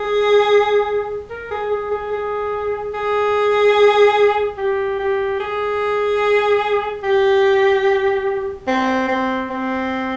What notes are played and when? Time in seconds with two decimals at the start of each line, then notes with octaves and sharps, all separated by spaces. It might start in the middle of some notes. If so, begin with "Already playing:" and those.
Already playing: G#4
1.30 A#4
1.51 G#4
1.71 G#4
1.91 G#4
2.12 G#4
2.94 G#4
4.58 G4
4.99 G4
5.40 G#4
7.03 G4
8.68 C4
9.08 C4
9.50 C4